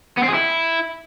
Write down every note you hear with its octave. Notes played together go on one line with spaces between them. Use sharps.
B3
C4
G#4
E4